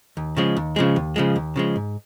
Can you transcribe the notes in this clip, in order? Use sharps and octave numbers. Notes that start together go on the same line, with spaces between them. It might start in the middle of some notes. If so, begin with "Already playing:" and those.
D#2
C#3 F3 G#3
D#2
C#3 F3 G#3
D#2
C#3 F3 G#3
D#2
C#3 F3 G#3
G#2